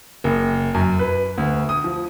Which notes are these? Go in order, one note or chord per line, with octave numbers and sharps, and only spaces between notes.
F#1
F#2
B4
D2
D#6
F3